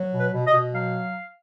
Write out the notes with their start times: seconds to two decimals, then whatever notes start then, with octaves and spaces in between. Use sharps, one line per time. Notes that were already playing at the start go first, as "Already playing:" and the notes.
Already playing: F#3
0.12 B2
0.19 B4
0.32 B2
0.47 D#5
0.53 B2
0.73 F#3 F5